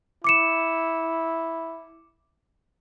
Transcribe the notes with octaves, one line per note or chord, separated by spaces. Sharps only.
E4 D6 C#7 E7